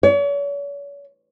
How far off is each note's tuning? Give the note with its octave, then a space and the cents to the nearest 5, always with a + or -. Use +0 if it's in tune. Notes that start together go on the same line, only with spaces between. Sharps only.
C#5 +40